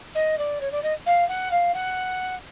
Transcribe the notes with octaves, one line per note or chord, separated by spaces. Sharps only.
D#5
D5
C#5
D5
D#5
F5
F#5
F5
F#5